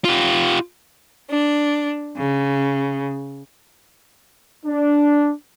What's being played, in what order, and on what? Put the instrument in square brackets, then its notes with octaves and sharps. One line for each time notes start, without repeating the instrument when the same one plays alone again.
[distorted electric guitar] F4 G4
[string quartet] D4
C#3
[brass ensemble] D4